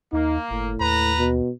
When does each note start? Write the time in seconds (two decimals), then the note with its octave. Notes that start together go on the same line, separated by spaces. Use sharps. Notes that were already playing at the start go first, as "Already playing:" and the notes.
0.13 D#2 A#3 D#4
0.51 G1 A2
0.81 D#2 B4 A#5
1.18 B2